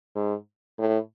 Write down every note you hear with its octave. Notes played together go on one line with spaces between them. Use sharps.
G#2
A2